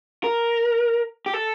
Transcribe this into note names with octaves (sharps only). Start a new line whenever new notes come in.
A#4
G4
A4